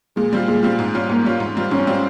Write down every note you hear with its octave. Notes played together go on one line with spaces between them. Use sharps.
A#2 G#3
G3 C4 F4
A#2 G#3
G3 C4 F4
G#2
G3 C#4 F4
G#2 A#3
G3 C#4 F4
G#2
G3 C4 F4
G#2 C#4
G3 C4 F4